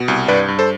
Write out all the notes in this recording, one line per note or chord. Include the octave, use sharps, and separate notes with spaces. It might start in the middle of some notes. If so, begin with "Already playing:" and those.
Already playing: B2
C2
G2 B4 D5
G2
A4 C5